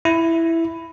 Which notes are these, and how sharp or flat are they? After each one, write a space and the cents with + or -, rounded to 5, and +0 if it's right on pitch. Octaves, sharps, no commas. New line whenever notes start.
E4 +5